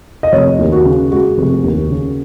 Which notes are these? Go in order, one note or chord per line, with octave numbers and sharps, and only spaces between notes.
D#5
F1 C#5
D#2
F#4
C#3
G#3 F#4
F1
D#2
C#3